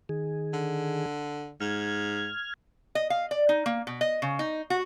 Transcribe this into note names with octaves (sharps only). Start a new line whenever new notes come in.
D#3 G#4
D3
G#2 F6 G#6
D#5
F5
D5
D#4
A#3
B2
D#5
C#3
D#4
F#4